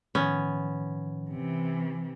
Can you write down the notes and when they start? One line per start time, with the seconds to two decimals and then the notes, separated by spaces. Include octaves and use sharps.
0.15 A2 D#3 F3 B3 C#4
1.31 C3 E3